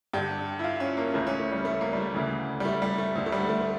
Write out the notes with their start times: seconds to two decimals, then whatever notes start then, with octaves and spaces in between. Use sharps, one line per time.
0.13 G2 D3 G4
0.59 E4
0.64 F4
0.80 C#4
0.97 A#3
1.14 C#2 C#3 E3 A3
1.27 C#4
1.40 A3
1.52 G3
1.65 A3
1.81 A#3
1.93 G3
1.98 A3
2.14 D2 C#3 E3
2.60 G3
2.65 A3
2.82 G3
2.98 A3
3.15 D2 D3
3.26 A3
3.32 G3
3.49 A3
3.61 A3